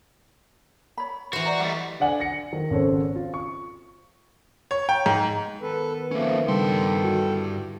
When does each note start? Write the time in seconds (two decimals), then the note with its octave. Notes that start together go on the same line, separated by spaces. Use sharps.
0.97 C#5 B5
1.33 E3 F#4 C5
1.45 D5 F#5 A#5
1.60 G3 A3 D#5 F#5
2.00 D3 D5 F#5 G#5 F#7
2.20 A#6 C#7
2.53 D#3
2.70 G#1 C#3 C#4 A4 C5
3.15 F4
3.34 C#6
4.71 C#5
4.89 G5
5.06 G#2
5.62 D#3 B3 A4 B4
6.11 F3 A3 A#3 C#4
6.48 G2 C#3 G3 D4 A4 G5 C6
7.04 D3 E4 F#4